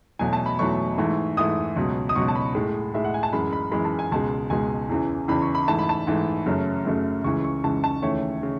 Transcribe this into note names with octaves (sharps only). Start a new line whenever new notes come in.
E2 B2 F#3 A3 G#5
A5
B5
E2 B2 F#3 A3 C#6
G#2 E3 A3
G#2 E3 A3 D#6
C#2 B2 F#3
D#6
C#2 B2 F#3 C#6
A5
B5
A2 G#3
A2 G#3 E5
F#5
G#5
A5
F#2 E3 G#3 B5
B5
F#2 E3 G#3 B5
A5
G#5
C#2 B2 G#3 A5
C#2 B2 G#3 G#5
E2 C#3 E3
E2 C#3 E3 B5
C#6
B5
G#2 E3 A3 A5
B5
A5
G#2 E3 A3
F#2 C#3 F#3 A3
F#2 C#3 F#3 A3
C#2 C#3 E3 C#6
C#6
C#2 C#3 E3 A5
A5
D#2 C#3 E3 A3 C#5
C#3